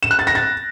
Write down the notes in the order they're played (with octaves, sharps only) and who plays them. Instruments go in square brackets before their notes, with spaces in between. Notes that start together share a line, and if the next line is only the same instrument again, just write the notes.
[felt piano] E7
F#6
A6
A#6
A6